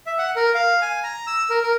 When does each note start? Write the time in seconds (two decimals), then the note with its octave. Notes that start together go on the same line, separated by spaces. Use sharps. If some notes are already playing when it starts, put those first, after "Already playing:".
0.06 E5
0.18 F#5
0.36 A#4
0.55 F5
0.82 G#5
1.04 A#5
1.27 E6
1.50 A#4
1.63 A#4